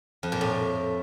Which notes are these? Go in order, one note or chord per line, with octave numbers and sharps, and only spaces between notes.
F2
A#2
A2